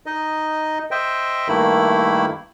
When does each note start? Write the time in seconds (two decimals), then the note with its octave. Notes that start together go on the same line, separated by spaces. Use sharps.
0.06 D#4 D#5
0.91 C5 D#5 E5 G5
1.49 G2 D#3 A3 A#3 E4 B5